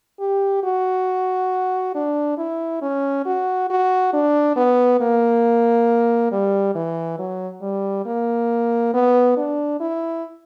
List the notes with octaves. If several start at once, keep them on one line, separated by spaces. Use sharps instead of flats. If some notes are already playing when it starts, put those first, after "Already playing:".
G4
F#4
D4
E4
C#4
F#4
F#4
D4
B3
A#3
G3
E3
F#3
G3
A#3
B3
D4
E4